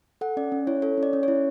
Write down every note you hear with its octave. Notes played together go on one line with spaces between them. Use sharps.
A4 F#5
C#4 D5
C#4
E4 C#5
A4 C#5
C#4
D5
C#4
E4 C#5